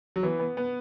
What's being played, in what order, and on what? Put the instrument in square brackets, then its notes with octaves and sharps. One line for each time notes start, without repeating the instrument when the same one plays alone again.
[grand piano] F#3
[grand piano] E3 [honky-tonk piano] B3
[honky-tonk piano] B3
B3